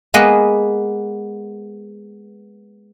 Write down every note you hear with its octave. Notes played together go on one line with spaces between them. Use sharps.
G#3 A#3 B3 B4 D#5